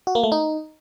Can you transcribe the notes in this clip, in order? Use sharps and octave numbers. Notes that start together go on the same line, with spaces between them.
F#4
A#3
A3
D#4